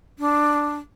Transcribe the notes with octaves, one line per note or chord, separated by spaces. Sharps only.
D4